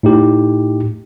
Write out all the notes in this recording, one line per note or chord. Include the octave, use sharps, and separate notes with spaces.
A2 D#4 G4